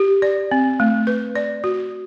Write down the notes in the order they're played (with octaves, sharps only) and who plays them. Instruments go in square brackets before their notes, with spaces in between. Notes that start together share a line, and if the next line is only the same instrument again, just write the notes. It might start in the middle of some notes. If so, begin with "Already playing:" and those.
Already playing: [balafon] G4
D5
C4
A3
B4
D5
F#4